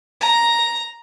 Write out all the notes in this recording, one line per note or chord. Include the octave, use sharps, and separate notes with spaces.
A#5